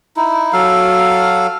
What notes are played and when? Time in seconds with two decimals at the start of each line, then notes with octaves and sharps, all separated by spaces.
0.16 D#4 E4
0.53 F#3 A4 F5